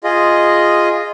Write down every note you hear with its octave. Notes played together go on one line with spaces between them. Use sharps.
F4 G#4 D#5